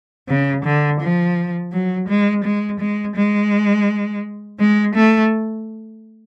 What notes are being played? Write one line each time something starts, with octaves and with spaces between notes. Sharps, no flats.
C#3
D3
F3
F#3
G#3
G#3
G#3
G#3
G#3
A3